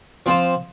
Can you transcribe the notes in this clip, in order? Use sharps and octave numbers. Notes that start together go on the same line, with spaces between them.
F3 C4 F4 C5